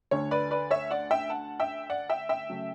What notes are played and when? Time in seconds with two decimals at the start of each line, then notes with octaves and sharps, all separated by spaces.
0.11 D2 D3 A3 C#5
0.31 B4 D5
0.51 B4 D5
0.71 C#5 E5
0.91 D5 F#5
1.11 E5 G5
1.30 F#5 A5
1.60 E5 G5
1.90 D5 F#5
2.10 E5 G5
2.29 E5 G5
2.49 C#3 F#3 A3